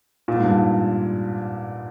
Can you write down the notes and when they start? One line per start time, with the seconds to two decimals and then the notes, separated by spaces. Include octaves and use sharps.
0.28 A#2
0.35 G#2
0.44 G2
0.51 G#2